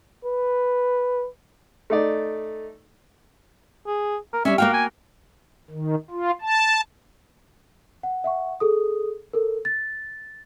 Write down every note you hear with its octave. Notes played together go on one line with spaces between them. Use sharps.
B4
A3 D#4 D5
G#4
A#4
G3 C#4 E5
A#3 F#4 F5 G5
G#5
D#3
F4
A5
F#5
E5 F#5 C#6
G#4 A4 D#6
A4 A#4
A6